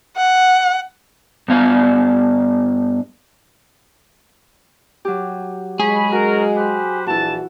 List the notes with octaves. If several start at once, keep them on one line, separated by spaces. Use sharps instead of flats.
F#5
G2 B3 F5
F#3 G4
G#3 G#4 C#5 B5
C#4 F#4 A#4
G4 B4 C5
A#1 E3 E4 F#4 A5